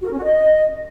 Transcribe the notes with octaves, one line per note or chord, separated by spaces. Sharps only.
F#4
A#4
C#4
F#4
D#5